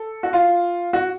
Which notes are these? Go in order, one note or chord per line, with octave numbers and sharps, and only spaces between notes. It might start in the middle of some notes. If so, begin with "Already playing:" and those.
Already playing: A4
F#4
F4
F#4